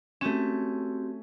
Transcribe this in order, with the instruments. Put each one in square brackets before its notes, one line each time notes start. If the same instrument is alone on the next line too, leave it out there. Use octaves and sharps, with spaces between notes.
[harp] A3 C#4 [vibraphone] C4 F#4 G4